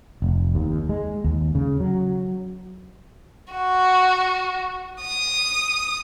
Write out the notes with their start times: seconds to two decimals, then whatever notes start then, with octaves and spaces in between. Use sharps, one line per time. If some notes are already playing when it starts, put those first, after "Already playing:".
0.22 F1
0.55 D#2
0.89 G#3
1.24 D#2
1.55 C#3
1.80 F#3
3.53 F#4
5.01 D#6